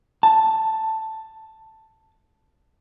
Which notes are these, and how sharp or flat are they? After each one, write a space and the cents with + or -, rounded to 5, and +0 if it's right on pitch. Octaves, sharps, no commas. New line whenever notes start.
A5 +5